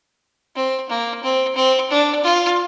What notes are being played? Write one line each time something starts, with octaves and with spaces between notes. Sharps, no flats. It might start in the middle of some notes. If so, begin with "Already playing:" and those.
C4
A#3
C4
C4
D4
F4